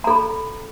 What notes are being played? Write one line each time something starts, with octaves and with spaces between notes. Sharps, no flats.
A4 A#5 B5